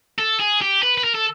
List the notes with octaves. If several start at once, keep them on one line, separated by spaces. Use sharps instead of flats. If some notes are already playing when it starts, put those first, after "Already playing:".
A4
G#4
G4
B4
B4
A#4
A4